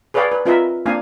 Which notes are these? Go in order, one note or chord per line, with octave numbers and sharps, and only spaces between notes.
G#4 B4 C#5 D5 F5 G5
B4
C4 F4 A#4 B4 D#5 E5
A#3 C4 D4 F5 G#5